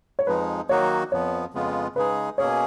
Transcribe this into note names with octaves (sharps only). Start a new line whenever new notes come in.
C#5
F2 F3 G#3 D#4 B4
D#3 F#3 A#3 D#4 F#4 C#5
F2 F3 B3 C#5
F2 C#3 G#3 B3 F4
C#3 G#3 D#4 G#4 B4
B2 A#3 C#4 G#4 C#5